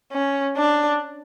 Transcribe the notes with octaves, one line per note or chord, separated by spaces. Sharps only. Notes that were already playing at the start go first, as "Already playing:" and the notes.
C#4
D4